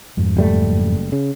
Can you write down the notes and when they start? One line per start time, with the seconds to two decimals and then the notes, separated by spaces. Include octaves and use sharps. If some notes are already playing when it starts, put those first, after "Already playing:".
0.17 F2 G#2
0.37 F#1 G3 A3
1.12 C#3